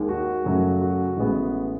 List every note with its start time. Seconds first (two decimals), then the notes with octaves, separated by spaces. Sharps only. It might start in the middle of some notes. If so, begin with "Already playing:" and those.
Already playing: D#2 D#3 G#3
0.09 F#4
0.45 F#2 C#3 F#3 A3
0.82 F#4
1.17 A1 A2 G#3 B3